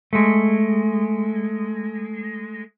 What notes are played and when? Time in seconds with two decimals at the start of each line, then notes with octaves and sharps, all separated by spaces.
0.13 G#3 A3